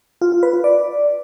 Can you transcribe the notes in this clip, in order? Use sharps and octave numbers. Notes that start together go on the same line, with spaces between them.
F4
F4
B4
F4
D5